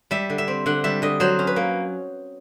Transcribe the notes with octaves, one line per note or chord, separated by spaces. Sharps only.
G3 E5
D3
E5
C4
D3 F#5
G3 E5
D3 D#5
F#3 C5
C#4
B4
A#3